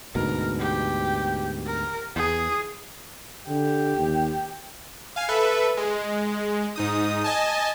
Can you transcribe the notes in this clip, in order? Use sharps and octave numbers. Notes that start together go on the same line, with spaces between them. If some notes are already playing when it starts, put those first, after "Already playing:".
D2 G#2 B2 A#4
G4
A#4
E2 G#4
D3 G4
D#2
F5 G#5
A4 B4 E5
G#3
G#2 D#4 D#6
D#5 G#5 A5